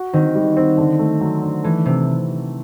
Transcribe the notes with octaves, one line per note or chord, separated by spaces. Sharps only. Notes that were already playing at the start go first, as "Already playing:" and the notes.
Already playing: F#4
D#3 C4
G3
C4
D3
A3
F#3
D4
E3 A3
C3 C4